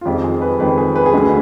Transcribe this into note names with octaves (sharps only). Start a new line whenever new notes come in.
F4
F2 D#3 G#3 G4
G#4
B4
F2 D#3 G#3 B4
G#4
B4
G#4
D2 D3 G#3 B4